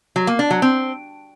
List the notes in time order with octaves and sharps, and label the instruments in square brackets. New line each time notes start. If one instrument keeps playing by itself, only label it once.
[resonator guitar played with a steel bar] F#3
A#3
D4
F#3
C4